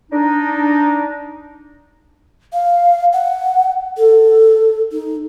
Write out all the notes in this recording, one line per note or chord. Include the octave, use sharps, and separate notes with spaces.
D4 D#4
F5
F#5
A4
D#4